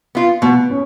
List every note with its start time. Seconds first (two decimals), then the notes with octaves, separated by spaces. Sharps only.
0.15 B3 F4
0.42 B2 B3
0.70 C#4